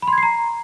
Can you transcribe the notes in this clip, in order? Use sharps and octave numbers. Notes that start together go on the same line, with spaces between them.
B5
C6
G#6
C7
A#5